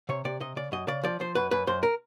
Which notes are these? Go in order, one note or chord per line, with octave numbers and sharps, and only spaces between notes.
C3 C#5
C3 D5
C3 D#5
C#3 D5
F#2 D#5
C#3 D5
F3 D5
F3 C5
F#2 B4
F#2 B4
F#2 C5
A#4